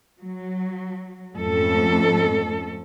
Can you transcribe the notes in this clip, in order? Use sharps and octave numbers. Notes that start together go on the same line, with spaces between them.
F#3
F2 G#2 A3 C#4 A4